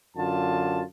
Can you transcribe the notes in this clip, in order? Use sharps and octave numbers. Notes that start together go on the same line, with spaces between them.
F#2 D3 F4 A5